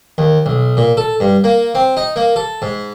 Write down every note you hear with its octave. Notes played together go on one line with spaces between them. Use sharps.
D#2
B1
A#2
A4
G2
A#3
C4
D#4
A#3
A4
G#2